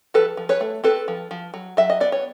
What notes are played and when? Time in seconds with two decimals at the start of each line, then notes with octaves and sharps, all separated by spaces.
0.14 F3 A4 B4
0.37 F3
0.49 B4 C#5
0.61 A3
0.84 C4 A4 B4
1.08 F3
1.31 F3
1.54 F#3
1.77 F#3 E5
1.90 D#5
2.00 B3 D5
2.12 C#5